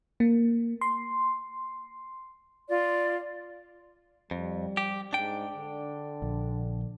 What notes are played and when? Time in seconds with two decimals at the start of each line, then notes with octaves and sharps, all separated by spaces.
0.20 A#3
0.81 C6
2.69 F4 D5
4.31 F2 G3
4.77 G4
5.13 G#2 D4 G5
5.56 D3
6.22 A#1